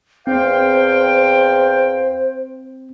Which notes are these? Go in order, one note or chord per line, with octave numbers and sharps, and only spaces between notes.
E2 C4 C5 F5 G5